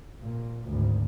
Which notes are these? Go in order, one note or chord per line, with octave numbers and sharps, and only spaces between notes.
A#2
G#1 D2